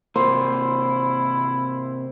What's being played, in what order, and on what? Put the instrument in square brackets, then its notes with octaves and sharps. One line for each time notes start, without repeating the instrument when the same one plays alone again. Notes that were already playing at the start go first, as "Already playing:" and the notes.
[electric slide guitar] C3 A#3 [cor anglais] E4 [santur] C5